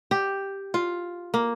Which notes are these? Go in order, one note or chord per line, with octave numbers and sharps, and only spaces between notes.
G4
F4
A#3